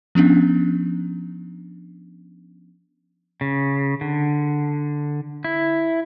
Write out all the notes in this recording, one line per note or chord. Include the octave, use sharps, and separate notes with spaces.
F3 B3 C#4 D4
C#3
D3
E4